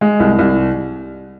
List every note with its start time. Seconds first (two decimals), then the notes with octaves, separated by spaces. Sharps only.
0.01 G#3
0.20 C2
0.39 C2